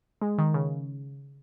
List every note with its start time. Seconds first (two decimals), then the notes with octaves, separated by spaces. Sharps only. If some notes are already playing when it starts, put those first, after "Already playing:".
0.22 G#3
0.38 D#3
0.54 C#3